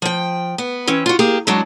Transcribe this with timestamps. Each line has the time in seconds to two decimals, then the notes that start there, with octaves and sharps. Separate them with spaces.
0.02 F3 G5
0.58 B3
0.87 E3 C4 C#4
1.06 F4 F#4
1.19 A#3 G4 G#4
1.47 F#3 G#3 D4 F#4